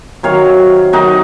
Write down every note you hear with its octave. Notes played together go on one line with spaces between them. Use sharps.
C3 D#3 F#3 C#5 F5
C3 D#3 F#3 D#4 F#4